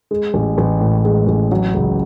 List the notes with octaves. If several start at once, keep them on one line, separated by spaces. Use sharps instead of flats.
G#3
A1
A1
A2
G#3
A1
F#3
C#2